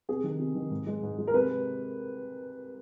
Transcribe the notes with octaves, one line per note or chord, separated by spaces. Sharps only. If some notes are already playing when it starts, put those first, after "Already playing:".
C3 G#4
D#3
C3
D#3
G#2
G#3
G#2
G#3
A#4
C3 B4